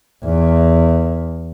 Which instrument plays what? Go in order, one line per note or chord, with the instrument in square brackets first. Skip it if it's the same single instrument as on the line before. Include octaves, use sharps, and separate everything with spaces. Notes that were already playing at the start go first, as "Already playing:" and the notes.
[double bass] E2